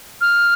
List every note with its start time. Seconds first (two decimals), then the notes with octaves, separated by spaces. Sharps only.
0.21 F6